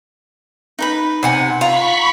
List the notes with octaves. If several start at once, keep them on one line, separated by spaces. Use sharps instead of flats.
D#4 B4 B5
C3 F#5 G#5
F4 A#5 B5 C#6 B6